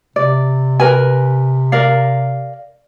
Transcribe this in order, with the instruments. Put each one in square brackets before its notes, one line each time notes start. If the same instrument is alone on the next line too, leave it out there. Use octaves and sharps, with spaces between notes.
[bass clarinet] C3 [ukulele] D5
[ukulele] A#4 B4 G#5
A#4 D5 F5